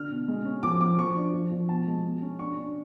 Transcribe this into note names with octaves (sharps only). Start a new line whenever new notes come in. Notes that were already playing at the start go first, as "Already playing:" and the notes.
Already playing: D3 D4 F6
B2
G#3
C#4
F3 D6
F3 D6
F3 C#6
D4
F3
F3
B2 A5
G#3
B2
C#4
D4 C#6
D4